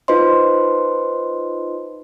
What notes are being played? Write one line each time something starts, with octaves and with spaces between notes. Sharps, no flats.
D#4 F4 B4 C5 D#5 C6